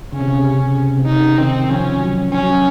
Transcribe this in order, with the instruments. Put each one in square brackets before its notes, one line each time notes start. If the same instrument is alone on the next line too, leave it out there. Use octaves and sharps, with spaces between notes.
[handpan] C#3 [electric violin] C#4
[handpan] C3
C#3
C3
C3
C3
[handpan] C#3 [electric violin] D#4
[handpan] D#3 [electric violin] C4
[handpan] F3 [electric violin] C#4
[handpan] F#3
[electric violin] C#4
[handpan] F#3